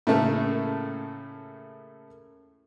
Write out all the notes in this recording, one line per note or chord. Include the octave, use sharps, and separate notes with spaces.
A2 C#3 A3 A#3